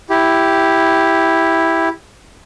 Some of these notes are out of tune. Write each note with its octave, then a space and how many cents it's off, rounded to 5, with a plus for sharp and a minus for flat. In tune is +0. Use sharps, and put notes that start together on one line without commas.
E4 +0 G4 +0